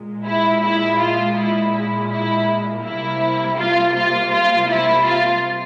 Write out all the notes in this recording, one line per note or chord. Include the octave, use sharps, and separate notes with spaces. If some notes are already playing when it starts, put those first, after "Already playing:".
Already playing: A#2 G#3
E4
E4
F4
E4
E4
E4
C3 G3 A#3 E4
F4
F4
F4
E4
F4